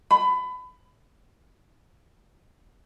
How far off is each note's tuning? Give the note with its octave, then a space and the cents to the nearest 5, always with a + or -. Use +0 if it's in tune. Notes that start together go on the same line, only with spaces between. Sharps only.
B5 +25